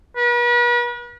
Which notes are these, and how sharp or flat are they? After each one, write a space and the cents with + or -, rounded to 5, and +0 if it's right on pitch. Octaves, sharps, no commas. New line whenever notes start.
B4 -40